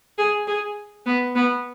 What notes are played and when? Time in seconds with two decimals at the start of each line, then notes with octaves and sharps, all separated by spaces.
0.18 G#4
0.47 G#4
1.06 B3
1.35 B3